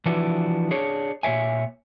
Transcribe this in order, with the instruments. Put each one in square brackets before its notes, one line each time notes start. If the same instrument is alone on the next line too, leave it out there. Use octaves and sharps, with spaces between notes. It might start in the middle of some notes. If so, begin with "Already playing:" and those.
[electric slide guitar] E3 F3 D4 E4 F#4 B4
D4 G#4 C#5
A#2 D#3 C#5 E5 G#5